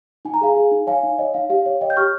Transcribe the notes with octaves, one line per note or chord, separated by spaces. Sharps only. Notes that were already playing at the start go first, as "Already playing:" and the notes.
D#4 G#5
A#5
G#4 F5 G#5
G#4
D#4
C#5 F5 G#5
D#4
C#5 D#5
D#4 F5
G4 F5
C#5
C#5 D#5 G5
G6
G4 C#6 F6